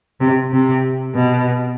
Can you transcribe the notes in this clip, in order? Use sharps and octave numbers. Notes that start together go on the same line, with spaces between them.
C3
C3
B2